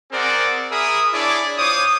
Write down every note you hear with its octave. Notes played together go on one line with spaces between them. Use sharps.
C4 G#4 A#4 C5 D5 F#5
G#4 A#4 E5 B5 D#6
D4 E4 G#4 C#5 D5
F4 C5 C#5 D6 D#6